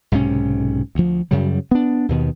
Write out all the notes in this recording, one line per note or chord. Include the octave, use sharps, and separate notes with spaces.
B1 G#2 C3 C#4
D2 F3
F#2 C#3 F#3 G3
B3 D4
D#2 B2 D#3